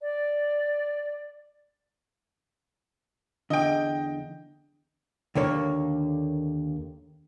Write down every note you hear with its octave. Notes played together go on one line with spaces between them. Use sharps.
D5
E2 D3 D#5 G5
D#2 D3 A#3 C#5